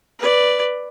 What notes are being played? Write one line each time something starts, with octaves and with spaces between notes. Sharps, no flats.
B4 D5